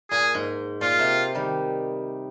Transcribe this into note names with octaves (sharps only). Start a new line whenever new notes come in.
A#2 G#4
G#2
A#2 F4
C3
D#3 G3